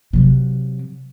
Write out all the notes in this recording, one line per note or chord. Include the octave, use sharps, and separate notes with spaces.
C3 F#3